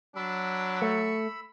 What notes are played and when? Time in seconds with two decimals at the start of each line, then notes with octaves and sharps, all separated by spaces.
0.16 F#3 D4 B5 E6
0.82 A3 C#6